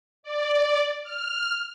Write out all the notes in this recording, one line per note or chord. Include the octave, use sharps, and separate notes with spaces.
D5
F6